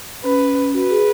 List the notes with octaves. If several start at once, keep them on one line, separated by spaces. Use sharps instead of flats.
C#4 B4
F#4 B4
G#4